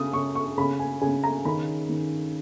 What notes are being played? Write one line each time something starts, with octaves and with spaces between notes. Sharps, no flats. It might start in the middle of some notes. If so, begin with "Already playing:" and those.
Already playing: C#3 D#6
C#3 C#6
C#6
C#3 B5
G#5
C#3 G#5
A#5
D#3 B5
D#3